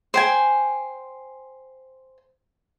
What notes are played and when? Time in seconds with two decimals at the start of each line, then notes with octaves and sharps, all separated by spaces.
0.14 C5 G5 G#5